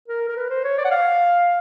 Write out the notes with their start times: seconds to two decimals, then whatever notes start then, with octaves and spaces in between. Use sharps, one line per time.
0.08 A#4
0.29 A#4
0.37 B4
0.50 C5
0.64 C#5
0.78 D5
0.85 F#5
0.91 F5